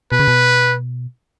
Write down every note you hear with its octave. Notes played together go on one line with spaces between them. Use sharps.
B2 B4
C#3
B2